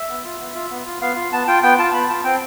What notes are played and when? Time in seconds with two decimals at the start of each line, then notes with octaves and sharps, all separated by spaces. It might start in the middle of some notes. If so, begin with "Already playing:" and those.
Already playing: E5
0.09 B3
0.24 F4
0.40 B3
0.55 F4
0.71 B3
0.86 F4
1.01 B3 F5
1.16 F4
1.32 B3 A5
1.47 F4 G5
1.63 B3 G5
1.79 F4 A5
1.94 B3 B5
2.09 F4 A5
2.25 C4 G5